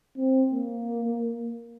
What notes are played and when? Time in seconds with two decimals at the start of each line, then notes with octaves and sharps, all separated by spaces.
0.17 C4
0.52 A#3